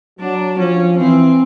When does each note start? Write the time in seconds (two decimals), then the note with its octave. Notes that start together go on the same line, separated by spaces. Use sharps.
0.20 F#3 D4
0.59 F3 C#4
0.98 E3 C4